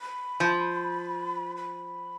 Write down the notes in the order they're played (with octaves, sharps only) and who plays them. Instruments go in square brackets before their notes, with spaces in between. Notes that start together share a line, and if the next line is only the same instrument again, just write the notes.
[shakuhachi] B5
[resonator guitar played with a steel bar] F3
[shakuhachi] B5